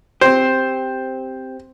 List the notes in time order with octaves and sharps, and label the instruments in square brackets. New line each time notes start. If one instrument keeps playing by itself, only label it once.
[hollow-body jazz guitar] C4 G4 [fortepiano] C5